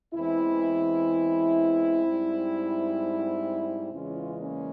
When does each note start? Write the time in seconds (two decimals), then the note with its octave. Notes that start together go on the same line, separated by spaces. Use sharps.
0.14 E2 E3 G#3 C4 E4
2.03 G#2 G3
3.91 E2 C#3 E3 G#3 C#4 F4
4.38 A#3 C#4